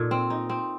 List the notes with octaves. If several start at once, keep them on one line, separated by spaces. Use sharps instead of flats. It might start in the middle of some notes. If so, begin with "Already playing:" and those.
Already playing: A#2 D#4 A4
C4
D#4
C4